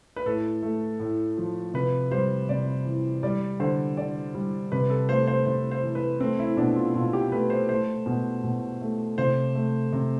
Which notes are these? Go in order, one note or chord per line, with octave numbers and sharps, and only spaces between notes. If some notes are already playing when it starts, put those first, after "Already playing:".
B4
A2 A4
A3
A2
F3
C3 B4
G3 C5
C3 D5
E3
G3 D5
D3 C5
D3 D5
G3
C3 B4
A4
A3 C5
C5
C3 C5
C5
E3
B4
A3 C4
E4
B2 D4
F4
B2 F4
G4
A3 B4
C5
A3 C5
B2
B2
A3
C3 C5
A3
C3